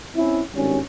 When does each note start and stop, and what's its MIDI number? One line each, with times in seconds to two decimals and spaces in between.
0.15 0.41 60
0.15 0.41 61
0.15 0.41 64
0.54 0.79 32
0.54 0.79 43
0.54 0.79 55
0.54 0.79 61